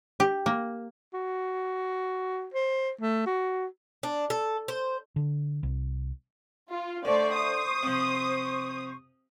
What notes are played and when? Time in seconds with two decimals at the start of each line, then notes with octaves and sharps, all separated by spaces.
0.20 G4
0.46 A#3
1.14 F#4
2.54 C5
3.01 A3
3.26 F#4
4.03 D4
4.30 A4
4.68 C5
5.16 D3
5.63 C2
6.71 F4
7.05 D3 A3 C5 D5 C#6
7.36 D#6
7.83 C3 F3